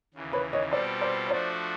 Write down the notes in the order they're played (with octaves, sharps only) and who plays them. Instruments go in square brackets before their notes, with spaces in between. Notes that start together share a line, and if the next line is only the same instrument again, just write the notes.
[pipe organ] D#2 C#3 E3
[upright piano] B4 C#5
C#5 D#5
[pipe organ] B2 G3 C4 F4 A4 [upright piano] C5 D5
[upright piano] C5 D5
C#5
[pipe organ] F3 A3 D4 F#4 [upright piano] C5 D5